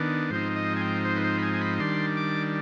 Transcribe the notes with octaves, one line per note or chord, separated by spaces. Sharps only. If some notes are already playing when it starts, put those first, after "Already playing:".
Already playing: D#3 B3 D4
G#2 F3 C4 D#4 C5
D#5
G#5
G5
C5
B4
C5
B5
G#5
G#5
B5
D#3 G3 D4 C6
D6